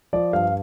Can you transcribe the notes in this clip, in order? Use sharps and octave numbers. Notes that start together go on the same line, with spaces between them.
F3 D5
G2 F5